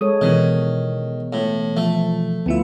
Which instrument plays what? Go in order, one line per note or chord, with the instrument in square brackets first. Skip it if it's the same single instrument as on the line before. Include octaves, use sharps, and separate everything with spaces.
[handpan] G#3 A4 C#5 [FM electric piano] D#6
[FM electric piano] B2 E3 B3 [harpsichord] D#3
[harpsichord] A2
[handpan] F3 [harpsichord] A3
[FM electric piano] D2 A3 E5 [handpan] B3 E4 F4